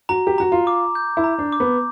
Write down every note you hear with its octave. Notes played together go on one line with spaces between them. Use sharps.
F#4 A#5
G4
F#4 A#5
F4
D6
G6
E4
A#5
D4
D6
B3